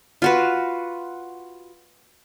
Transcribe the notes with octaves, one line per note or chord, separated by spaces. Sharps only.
F4 F#4 B4